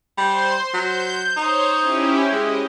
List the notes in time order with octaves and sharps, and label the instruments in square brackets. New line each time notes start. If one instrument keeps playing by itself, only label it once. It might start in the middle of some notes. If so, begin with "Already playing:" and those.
[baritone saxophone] G3 [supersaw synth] C5 C6
[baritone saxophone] F#3 [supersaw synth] G6
[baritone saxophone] D#4 [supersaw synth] C5 C#5
[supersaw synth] C#4 E4 G4
[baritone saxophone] G#3 [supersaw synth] D#5